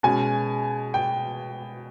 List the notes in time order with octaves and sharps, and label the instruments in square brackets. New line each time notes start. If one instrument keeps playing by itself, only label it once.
[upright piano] B2 G#3 C#4 G#5
G5